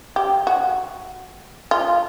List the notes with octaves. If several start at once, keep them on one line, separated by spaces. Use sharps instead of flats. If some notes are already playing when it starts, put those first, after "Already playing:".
G4
F#4
F4